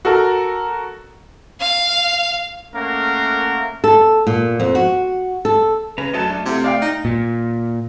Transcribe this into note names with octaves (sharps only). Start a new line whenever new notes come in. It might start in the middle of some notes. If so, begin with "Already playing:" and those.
F#4 A4 A#4 A#5
F5
A3 A#3 C#4 A#4 F5 F#5
A4
A#2
F2
F#4
A4
C#3 C#4 B4 A#5
F#2 F#3 A3 D#5 A5
A3 D4
C3 E4 F4 A4
D5 F5 G5 F6
D#4
A#2